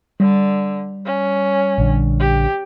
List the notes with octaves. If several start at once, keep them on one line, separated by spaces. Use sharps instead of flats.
D3 G3
C#4
A#1 D3
G4